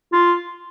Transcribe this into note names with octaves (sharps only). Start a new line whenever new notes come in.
F4